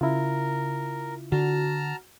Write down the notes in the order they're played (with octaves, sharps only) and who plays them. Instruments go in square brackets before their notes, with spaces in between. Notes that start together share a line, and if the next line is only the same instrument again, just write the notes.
[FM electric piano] C#3 [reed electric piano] E4 F4 [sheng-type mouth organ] A#4
[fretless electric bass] D3 [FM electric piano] F#4 [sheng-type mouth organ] A5 A#5 F6